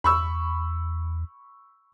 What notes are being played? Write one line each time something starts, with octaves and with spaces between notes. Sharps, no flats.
E2 B5 C#6 E6